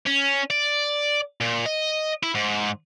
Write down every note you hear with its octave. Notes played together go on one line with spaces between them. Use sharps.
C#4
D5
A#2
D#5
E4
G#2